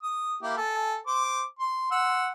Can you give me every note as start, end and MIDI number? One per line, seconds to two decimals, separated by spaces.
0.03 0.35 87
0.43 0.56 58
0.43 0.56 64
0.43 0.56 67
0.57 0.97 69
0.57 0.97 80
1.07 1.42 72
1.07 1.42 86
1.59 1.90 84
1.91 2.29 78
1.91 2.29 84
1.91 2.29 88